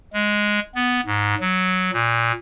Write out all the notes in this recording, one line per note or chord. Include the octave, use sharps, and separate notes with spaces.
G#3
B3
G#2
F#3
A#2